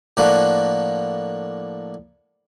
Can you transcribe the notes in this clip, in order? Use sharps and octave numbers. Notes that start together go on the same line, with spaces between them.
A2 F3 A#3 D4 F#4